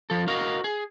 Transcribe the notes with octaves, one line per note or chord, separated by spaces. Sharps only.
F3 A4
F#4 A#4 D#5 F5
G#4